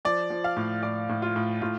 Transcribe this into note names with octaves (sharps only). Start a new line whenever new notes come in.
F3 D5
F3
F5
A2
A2 D5
A2
F4
A2
A2 F4